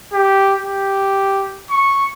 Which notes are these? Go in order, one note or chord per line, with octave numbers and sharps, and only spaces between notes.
G4
G4
C#6